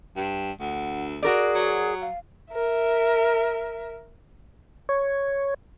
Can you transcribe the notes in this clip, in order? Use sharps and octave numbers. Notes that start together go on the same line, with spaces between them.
G2
D2 F#5
F#4 G#4 A#4 D5
F#3
F5
A#4 E5
C#5